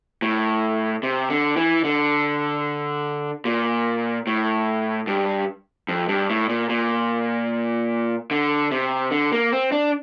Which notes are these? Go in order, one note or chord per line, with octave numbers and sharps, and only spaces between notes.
A2
C3
D3
E3
D3
A#2
A2
G2
F2
G2
A2
A#2
A#2
D3
C3
D3
A#3
C4
D4